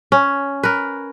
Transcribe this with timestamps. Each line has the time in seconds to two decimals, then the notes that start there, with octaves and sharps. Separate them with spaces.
0.12 C#4
0.63 A#4 B4